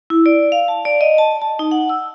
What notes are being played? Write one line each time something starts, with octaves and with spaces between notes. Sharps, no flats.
E4
D5
F5
A5
D5
D#5
A5
A5
D#4
F#5
E6